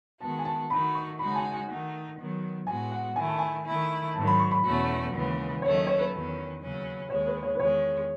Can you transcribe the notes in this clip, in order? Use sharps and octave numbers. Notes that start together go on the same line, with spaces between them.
D#3 G#3 B3 F#4 A5
G#5
A5
D#3 A3 D#4 F#4 B5
C#6
C#3 G#3 D#4 F#4 B5
A5
G#5
G#5
D#3 A3 D#4 F#5
D#3 F#3 B3
A2 G#3 B3 F#4 G#5
F#5
D#3 A3 E4 G#5
A5
G#5
D#3 A3 E4
G#2 D#3 F#3 A5
B5
C#6
B5
E2 B2 A3 C#4 F#4
D#2 C#3 E3 G#3 B3
D#2 D#3 F#3 A3 C#4 C#5
D#5
C#5
B4
E2 D#3 F#3 C#4
D#2 C#3 F#3 C#4
D#2 D#3 G#3 C#5
B4
C#5
B4
E2 D#3 G#3 C#5